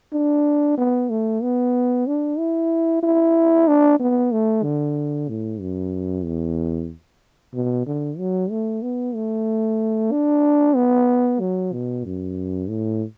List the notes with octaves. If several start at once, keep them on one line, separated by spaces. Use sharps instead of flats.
D4
B3
A3
B3
D4
E4
E4
D4
B3
A3
D3
A2
F#2
E2
B2
D3
F#3
A3
B3
A3
D4
B3
F#3
B2
F#2
A2